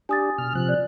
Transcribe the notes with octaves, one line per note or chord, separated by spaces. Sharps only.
D4 G4 G#5 D#6 A6
B2 F6
C3 F3 F#6
D5